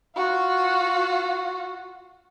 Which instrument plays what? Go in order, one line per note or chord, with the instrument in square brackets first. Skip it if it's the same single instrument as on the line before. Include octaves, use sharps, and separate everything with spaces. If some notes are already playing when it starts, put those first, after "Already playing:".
[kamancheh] F4 F#4